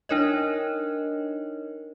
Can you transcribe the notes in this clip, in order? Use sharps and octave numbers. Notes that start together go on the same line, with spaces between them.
D4 D#4 A#4 C#5 D#5